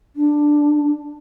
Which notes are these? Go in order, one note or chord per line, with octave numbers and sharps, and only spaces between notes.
D4